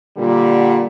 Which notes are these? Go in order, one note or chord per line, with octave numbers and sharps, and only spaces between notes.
A#2 D3 G3